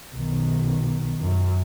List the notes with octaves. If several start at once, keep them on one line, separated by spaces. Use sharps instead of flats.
B1 D#3
F#2